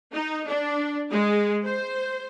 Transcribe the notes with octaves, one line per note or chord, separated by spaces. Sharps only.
D#4
D4
G#3
C5